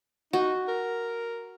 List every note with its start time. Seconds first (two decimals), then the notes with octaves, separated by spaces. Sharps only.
0.33 D#4 F#4
0.68 A#4